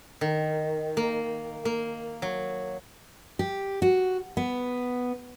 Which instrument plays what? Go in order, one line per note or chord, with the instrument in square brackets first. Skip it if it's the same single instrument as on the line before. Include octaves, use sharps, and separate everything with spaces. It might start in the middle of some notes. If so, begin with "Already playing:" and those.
[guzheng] D#3
A#3
A#3
F#3
[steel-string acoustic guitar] G4
F#4
B3